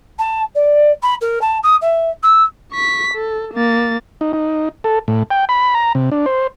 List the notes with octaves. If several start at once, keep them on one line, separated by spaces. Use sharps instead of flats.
A5
D5
B5
A#4
A5
D#6
E5
E6
C#6 B6
A4
A#3 A6
D#4
D#4
A4
A2
G5
B5
A#5
C3
D4
C5